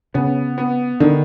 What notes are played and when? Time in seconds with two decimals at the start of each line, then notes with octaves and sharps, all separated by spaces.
0.14 C#3 B3
0.58 B3
1.00 D3 D#3